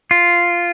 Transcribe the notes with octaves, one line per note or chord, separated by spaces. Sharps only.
F4